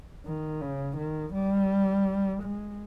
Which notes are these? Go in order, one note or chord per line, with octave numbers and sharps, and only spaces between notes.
D#3
C#3
D#3
G3
G#3